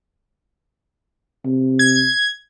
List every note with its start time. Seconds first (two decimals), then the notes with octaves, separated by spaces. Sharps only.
1.45 C3
1.79 G#6